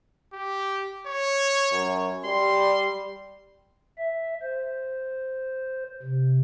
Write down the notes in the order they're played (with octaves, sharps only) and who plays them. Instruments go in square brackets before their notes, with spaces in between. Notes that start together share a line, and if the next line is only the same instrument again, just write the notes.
[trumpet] G4
C#5
[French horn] F#2
[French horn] G3 [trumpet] C6
[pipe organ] E5
C5
C3